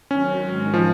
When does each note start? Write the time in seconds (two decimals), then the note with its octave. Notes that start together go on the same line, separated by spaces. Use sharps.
0.11 D#3 F#3 C4 C#4 F#4
0.42 G#2 D#3 G#3 D#4
0.74 F3